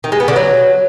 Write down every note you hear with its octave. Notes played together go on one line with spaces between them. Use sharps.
D#3
G#3
B3
D3
F#3